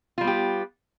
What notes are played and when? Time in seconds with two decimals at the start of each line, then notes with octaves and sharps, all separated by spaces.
0.18 F4
0.21 G3
0.24 B3
0.27 G4